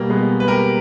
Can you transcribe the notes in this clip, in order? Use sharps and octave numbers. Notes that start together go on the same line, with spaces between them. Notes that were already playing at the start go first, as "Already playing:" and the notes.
Already playing: B2 G3 A#3
G#3 B3
B4
G4 A#4